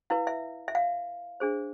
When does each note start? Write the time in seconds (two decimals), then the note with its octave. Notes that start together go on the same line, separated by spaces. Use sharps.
0.10 E4 B4 F5
0.27 E5
0.68 E5
0.75 F5
1.40 D4 G#4 C5